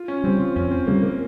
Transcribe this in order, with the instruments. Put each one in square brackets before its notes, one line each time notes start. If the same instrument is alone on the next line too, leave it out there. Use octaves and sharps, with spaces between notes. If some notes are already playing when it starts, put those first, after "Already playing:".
Already playing: [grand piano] F4
C#4
[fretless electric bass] C#3 G3 [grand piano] C4
[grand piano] F4
[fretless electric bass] F2 [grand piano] C#4
[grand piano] C4
[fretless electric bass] C#3 G3 [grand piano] A#3
[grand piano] A#3